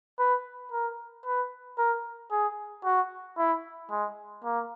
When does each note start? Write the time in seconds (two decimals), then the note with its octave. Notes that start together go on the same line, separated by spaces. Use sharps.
0.19 B4
0.72 A#4
1.26 B4
1.78 A#4
2.31 G#4
2.85 F#4
3.38 E4
3.90 G#3
4.44 A#3